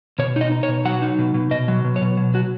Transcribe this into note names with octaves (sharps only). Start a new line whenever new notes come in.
B2 C#5
D#4 D#5
D#4
C#5
B2
F#3 F#5
D#4
B2
B2
B2 D#5
F#3
B2
C#5
B2
F#3
F#3 F#4